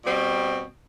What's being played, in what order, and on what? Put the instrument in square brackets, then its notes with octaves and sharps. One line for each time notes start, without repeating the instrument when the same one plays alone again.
[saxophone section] B2 G3 C4